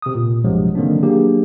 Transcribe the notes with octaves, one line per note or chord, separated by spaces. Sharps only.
C3 D#6
A#2
B1 G2 C3 F3 F#3 G#3
D3 D#3 F#3 A#3 C4 D4
F#3 A#3 D4 G4 G#4